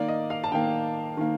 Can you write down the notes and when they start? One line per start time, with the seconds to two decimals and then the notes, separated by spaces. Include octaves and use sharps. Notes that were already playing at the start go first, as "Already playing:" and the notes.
Already playing: D#3 A#3 D5
0.08 D#5
0.30 F5
0.44 A5
0.52 D#3 A#3 G5
1.17 D#3 A#3